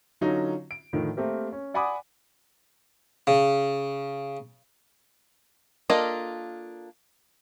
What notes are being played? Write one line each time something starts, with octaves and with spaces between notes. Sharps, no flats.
D3 F#3 C#4 D#4 F4
D7
A2 D3 D#3 F3
A3 A#3 C4 G4 A#4
C#4
D5 F#5 G#5 B5 D6 D#6
C#3
A#3 D4 F4 A4 D#5